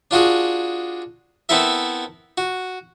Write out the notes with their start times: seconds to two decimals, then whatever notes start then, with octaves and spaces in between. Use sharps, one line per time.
0.11 D4 F4 F#4 G#4
1.49 B3 C4 E4 A4 A#4 E5
2.38 F#4